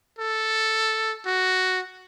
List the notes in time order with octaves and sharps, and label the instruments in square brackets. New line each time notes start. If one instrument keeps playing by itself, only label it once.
[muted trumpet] A4
F#4